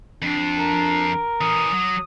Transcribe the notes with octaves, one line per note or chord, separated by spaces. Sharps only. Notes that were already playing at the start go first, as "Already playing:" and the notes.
F2 C4 D4
A#4
E3 C#4 D#6
F#3